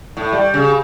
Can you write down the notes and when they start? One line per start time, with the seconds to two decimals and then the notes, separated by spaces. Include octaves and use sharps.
0.17 A2
0.32 G3
0.54 C#3